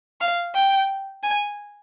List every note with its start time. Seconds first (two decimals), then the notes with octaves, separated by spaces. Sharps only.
0.21 F5
0.55 G5
1.23 G#5